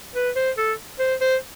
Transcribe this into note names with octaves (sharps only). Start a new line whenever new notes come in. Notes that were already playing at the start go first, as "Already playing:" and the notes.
B4
C5
A4
C5
C5